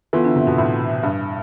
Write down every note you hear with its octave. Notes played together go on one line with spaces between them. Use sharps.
E3 B3 F4 A4 E5
D3
C3
B2
A2
G2